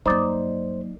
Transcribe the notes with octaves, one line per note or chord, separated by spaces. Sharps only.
G2 F#3 A#3 D#4 C5 D5